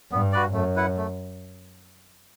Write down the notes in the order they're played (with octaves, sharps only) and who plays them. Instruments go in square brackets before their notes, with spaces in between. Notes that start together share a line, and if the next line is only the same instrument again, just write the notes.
[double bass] G2 [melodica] B3
[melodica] F#4 B4 D5
[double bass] F#2 [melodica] A3
[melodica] E4 B4 F#5
A3